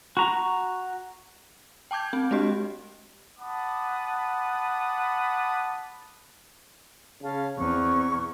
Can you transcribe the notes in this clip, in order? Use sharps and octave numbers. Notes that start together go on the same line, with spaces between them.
F#4 A#5
G5 A5 D6 G6 G#6
C4
G#3 D4 F#4 G4 D#5
F#5 A5 B5 D6 D#6
C#3 C#4 F5 A5
E2 C4 C#6